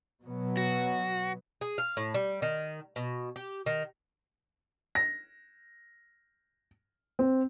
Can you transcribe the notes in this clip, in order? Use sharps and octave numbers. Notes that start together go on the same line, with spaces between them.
B2 F#3 B3
F#4
G#4
F5
A2
G3
D#3
B2
G4
D#3
A#6
C4